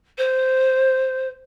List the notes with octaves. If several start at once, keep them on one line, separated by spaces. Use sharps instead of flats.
C5